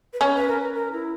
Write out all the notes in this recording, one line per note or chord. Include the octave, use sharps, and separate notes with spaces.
B4
C#4 C#5
B4
A#4
B4
A#4
E4